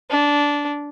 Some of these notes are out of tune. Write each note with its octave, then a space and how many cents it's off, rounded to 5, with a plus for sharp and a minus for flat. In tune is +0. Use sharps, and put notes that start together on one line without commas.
D4 -15